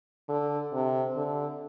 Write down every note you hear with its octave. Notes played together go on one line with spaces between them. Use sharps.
D3
C3
D3